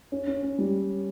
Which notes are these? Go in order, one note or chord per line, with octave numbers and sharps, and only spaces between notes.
C#4
C#4
C#4
G3